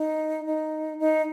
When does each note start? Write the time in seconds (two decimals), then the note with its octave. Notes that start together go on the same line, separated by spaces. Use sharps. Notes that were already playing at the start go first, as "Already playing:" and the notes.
Already playing: D#4
0.46 D#4
1.00 D#4